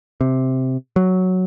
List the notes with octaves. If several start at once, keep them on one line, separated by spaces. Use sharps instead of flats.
C3
F#3